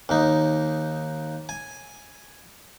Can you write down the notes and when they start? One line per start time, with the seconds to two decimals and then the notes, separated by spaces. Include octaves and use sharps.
0.09 D#2 D#4
1.49 G#5